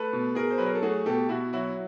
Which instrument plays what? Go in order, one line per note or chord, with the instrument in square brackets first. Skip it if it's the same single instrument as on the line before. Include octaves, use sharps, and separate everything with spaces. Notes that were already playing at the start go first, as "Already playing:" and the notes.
Already playing: [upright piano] A3 A4 B4
B2
B2 G#4 A#4
C5
F#3 B4
A#4
A4
A3 F#4 G#4
B2 G4 A4
B2 E4 F#4
F#3 E4 F#4